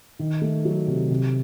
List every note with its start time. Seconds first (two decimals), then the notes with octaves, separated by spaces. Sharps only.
0.19 D#3
0.42 A3
0.65 F#3
0.87 C3
1.10 C3